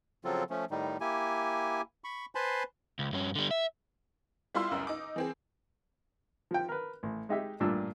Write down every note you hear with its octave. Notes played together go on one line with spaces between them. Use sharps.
C#3 F3 F#3 C4 F4 A4
F3 A3 C#4
A2 D#3 G3 D#4
A#3 E4 G4 G#5
B5 C#6
B4 C5 G#5 A5 B5 C6
C#2
G2 C#4
D3 G3
E5
G3 E4 F4 F5 C6 E6
C#2 F#2 C#3
D#4 D6
E3 C4 G#4
F3 G5
A#4 B4
A1
G#3 D#4 G4 E5
A1 G2 A#2 D4 E6